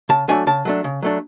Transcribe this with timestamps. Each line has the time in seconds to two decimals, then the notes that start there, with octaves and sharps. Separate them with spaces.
0.09 C#3 A5
0.28 F#3 A3 D4 G#5
0.47 C#3 A5
0.65 F#3 A3 D4
0.84 C#3
1.02 F#3 A3 D4